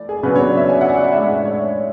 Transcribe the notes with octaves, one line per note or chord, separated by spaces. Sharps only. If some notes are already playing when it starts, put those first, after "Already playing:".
Already playing: E3 A3 D5
G#4
C#3 F#3 B3 D4 B4
C#5
D5
E5
G#5
F#5
D5
E5
E5
A2 G#3 D4 E5
C#5
C#5